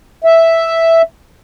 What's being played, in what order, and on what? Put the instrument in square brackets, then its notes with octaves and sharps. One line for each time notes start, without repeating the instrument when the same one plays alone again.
[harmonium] E5